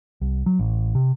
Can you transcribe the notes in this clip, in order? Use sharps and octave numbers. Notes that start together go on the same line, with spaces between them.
C2
F#3
A1
C3